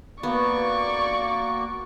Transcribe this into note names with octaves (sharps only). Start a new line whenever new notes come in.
A#3 B3 F#4 D5 C#6